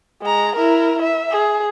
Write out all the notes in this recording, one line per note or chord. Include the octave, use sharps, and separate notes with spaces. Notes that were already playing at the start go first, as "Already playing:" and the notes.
G#3 A#5
E4 A#4
E5
G#4